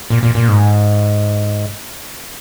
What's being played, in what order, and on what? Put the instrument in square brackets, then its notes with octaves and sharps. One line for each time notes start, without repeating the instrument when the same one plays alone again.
[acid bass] A#2
A#2
A#2
G#2